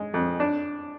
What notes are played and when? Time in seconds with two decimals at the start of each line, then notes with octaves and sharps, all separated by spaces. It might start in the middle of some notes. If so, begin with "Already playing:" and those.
Already playing: G#3
0.14 F2
0.40 D4